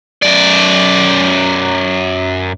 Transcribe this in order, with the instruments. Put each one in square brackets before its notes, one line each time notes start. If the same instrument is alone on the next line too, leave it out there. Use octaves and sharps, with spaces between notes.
[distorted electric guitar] F#2 D5